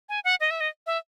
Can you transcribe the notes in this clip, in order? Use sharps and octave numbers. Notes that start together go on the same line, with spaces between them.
G#5
F#5
D#5
E5
D#5
E5